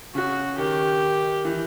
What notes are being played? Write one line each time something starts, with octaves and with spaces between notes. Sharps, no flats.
C#3 F#4
D#3 G4
E3